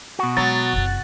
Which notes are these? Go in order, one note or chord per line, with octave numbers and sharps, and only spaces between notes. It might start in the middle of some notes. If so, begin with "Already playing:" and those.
B2 F#4
F#3 G#3 A6
F#1 C3